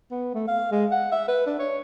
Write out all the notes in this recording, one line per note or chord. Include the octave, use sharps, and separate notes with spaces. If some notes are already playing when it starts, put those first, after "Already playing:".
B3
A3
F5
G#3
F#5
E5
B4
D4
C#5